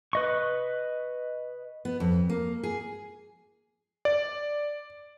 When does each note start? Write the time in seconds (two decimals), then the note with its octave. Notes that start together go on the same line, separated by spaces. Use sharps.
0.13 B4 D#5 C#6
1.85 B3
2.00 F2
2.29 A#3
2.63 G#4
4.05 D5